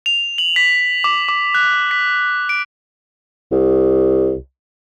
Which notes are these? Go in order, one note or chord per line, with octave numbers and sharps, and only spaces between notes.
F7
F#7
B6
D6
D6
F#6
B6
D7
C2